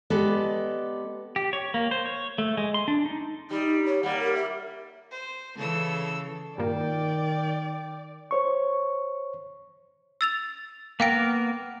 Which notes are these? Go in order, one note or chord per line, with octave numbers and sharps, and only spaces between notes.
G#3 B3 G4 A4 D5
G4
C#5
A#3
C5
C#5
A3
G#3
C6
D4
D#4
G3 D#4
C#5
G3 A#3 F#5
A#4
E5
C5
C#3 E3 A4 E6
G2 A#2 D#3 A#3 D5 G5
C5 C#5 C#6
E6 A6 F7
A#3 B3 A#4 F5 G5 D7